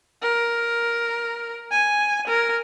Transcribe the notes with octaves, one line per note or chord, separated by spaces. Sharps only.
A#4
G#5
A#4